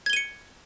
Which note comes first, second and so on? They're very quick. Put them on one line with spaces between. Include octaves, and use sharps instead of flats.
G#6 G7 D#7 C#7